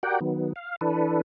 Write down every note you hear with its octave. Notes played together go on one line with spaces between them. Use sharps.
F#4 G4 A#4 D5 F#5 G5
D#3 F#3 B3
F5
E3 D4 A4 B4